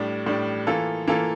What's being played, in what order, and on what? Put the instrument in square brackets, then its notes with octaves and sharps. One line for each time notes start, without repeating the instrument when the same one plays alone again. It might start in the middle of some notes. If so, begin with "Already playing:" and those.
Already playing: [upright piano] A2 G3 D4
A2 G3 D4
E3 A#3 F4 A4
E3 A#3 F4 A4